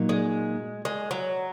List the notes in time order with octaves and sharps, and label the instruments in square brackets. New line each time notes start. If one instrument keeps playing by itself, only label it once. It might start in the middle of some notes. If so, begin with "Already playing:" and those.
Already playing: [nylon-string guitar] A#2 F#3 A#3 D#4
[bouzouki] G#3
G#3
F#3